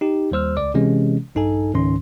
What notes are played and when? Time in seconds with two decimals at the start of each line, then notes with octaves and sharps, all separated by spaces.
0.01 D#4 G4
0.31 D#2 G3 C5 E6 F6
0.57 C#2 D5 D6
0.74 C3 E3 G#3 C#4
1.35 A#1 G2 D#4 A4 G#5
1.74 C#2 G#2 D#3 C#4 C6